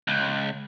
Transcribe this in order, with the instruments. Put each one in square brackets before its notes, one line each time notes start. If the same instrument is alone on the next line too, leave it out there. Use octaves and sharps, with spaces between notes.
[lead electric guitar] C#2